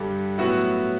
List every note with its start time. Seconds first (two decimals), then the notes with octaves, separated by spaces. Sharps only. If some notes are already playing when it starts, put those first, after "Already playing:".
Already playing: G2 D3 G3 D4 G4
0.38 A2 F#3 B3 E4 F#4